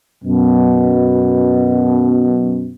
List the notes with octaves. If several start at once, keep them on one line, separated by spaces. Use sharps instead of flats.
F#2 B2